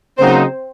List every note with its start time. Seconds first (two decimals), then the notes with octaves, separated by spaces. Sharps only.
0.18 C#3 F#3 A#3 C4 D#4 F#4 C5